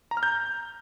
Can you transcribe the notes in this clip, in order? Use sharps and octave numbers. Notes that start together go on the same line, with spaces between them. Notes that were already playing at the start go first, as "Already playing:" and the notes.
A#5
F6
G6